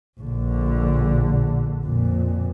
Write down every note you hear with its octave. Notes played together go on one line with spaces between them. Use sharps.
A#1 D3
F2 A#2